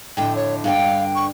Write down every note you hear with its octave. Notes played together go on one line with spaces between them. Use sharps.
F2 A2 D3 G5
C#5
G2 D3 F5 G5
C#6